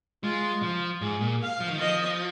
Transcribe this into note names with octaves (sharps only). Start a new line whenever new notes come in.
G#3 F4
F3
G#2 G#4
A#2
F5
F3
D#3
F3 D#5